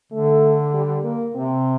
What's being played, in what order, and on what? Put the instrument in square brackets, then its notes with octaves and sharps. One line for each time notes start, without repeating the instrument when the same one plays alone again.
[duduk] D3 [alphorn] A3
[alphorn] G3
A#3
[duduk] C3 [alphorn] C4